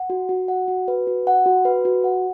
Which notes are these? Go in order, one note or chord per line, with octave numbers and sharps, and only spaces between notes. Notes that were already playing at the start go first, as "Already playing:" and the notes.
Already playing: F#5
F#4
F#4
F#5
F#4
B4
F#4
F#5
F#4
B4
F#4
F#5